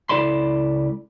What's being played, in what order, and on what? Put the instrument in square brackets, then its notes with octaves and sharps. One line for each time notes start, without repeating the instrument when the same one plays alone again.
[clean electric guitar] C#2 E4 A4 D5 B5 C6